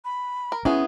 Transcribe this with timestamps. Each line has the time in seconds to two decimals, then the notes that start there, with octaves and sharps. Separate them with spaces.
0.05 B5
0.52 A#4
0.65 B3 C#4 E4 G#4